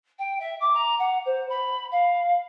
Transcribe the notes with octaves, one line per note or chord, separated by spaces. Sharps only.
G5
E5
D6
A#5
F#5
C5
B5
F5